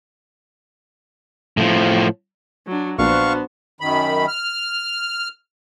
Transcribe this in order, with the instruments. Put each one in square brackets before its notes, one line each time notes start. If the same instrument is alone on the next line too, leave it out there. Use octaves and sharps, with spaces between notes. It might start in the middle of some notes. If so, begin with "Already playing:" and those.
[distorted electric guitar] A2 F3
[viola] F#3 D4
[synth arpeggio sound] A#1 [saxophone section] B3 D4 [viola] F#4 C5 [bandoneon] F5 C#6
[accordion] F#2 D#3 B5
F6